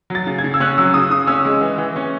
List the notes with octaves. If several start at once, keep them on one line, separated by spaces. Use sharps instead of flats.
F#3 A6
C#3
G#6
C#3
E6
C#4 F#6
F#3 E6
C#3 D#6
C#3 D#6
C#4 E6
G#3
E3
E3
C#4